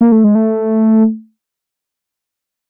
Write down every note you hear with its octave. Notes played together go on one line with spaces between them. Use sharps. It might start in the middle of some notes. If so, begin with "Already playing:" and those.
A#3
A3
G#3
A3